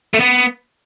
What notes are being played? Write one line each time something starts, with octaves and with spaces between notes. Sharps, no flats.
A3
B3